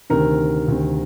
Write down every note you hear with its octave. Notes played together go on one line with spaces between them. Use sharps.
D2 C3 D#3 A#4
D2 C3 D#3